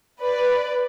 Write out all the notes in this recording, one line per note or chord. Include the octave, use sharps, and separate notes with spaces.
B4 D5